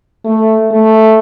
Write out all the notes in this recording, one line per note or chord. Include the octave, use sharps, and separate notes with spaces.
A3
A3